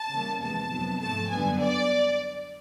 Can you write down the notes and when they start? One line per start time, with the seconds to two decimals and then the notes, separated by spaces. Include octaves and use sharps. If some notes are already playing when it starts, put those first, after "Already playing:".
Already playing: A5
0.11 C#3 E3 G3 A#3
0.41 E2 C3 F3 G#3 B3 A5
0.71 F2 C3 D#3 F#3 B3
1.00 G#2 F3 A3 A5
1.30 F#2 D3 G3 B3 G#5
1.61 D5